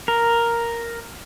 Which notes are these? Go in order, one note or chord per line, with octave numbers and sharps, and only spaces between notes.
A#4